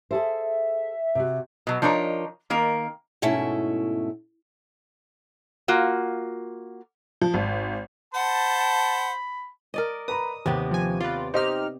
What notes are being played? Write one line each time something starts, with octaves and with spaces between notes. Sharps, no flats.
G#4 A4 C5 E5
C3 F#4
B2 F#3
F3 D4 D#4 A#4 C#5
D#3 A#3 A#4
G#2 B2 A3 C#4 E4 E5
A#3 F4 F#4
F3
G#1
C5 F#5 A5 B5
A#4 D5 D#5
B4 A#5 B5 D#6
D#2 C3 B3 G4
F3 G#5
F4 B4 D5
D#4 G4 C5 D#5 D6 F6